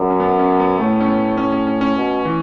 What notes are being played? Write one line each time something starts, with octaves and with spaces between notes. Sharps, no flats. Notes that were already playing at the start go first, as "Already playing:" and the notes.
Already playing: F#2
C#4
B3
C#4
B3
A2 A3
C#4
B3
C#4
C#4
C#4
C#4
B2
E3